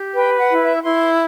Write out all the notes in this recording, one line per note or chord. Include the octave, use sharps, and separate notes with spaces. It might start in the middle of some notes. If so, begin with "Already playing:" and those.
Already playing: G4
B4 G5
F#5
E4
E5
E4 C6